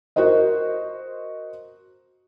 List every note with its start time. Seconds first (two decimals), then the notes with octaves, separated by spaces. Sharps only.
0.16 F#4 A#4 C5 D#5